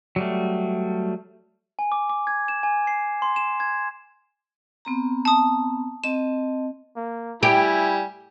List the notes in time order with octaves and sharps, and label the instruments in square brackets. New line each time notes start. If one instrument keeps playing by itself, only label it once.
[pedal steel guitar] F#3 G3 A3
[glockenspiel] G#5
D6
D6
G#6
E7
G#5
C7
C6
E7
G#6
[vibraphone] B3 C4 A#5
[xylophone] A5 D#6
[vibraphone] C4 D#5 A5 [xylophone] E7
[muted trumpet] A#3
[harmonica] G3 E4 [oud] G4 [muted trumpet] G#5